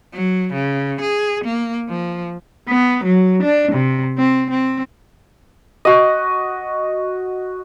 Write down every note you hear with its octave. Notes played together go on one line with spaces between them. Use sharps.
F#3
C#3
G#4
A#3
F3
B3
F#3
D4
C3
C4
C4
F#4 D#5